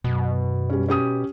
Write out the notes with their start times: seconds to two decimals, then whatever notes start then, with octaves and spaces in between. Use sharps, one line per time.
0.04 F#2 B2
0.70 G3 C#4
0.89 C#4 G4 D#6